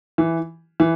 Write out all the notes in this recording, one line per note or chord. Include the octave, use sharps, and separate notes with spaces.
E3
E3